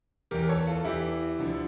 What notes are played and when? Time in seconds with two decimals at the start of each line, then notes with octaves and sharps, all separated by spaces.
0.31 E2 E3 G4 A#4
0.43 A#4
0.49 A4 C#5
0.67 F4 A4
0.85 E2 E3 E4 G4
1.39 D2 D3 F3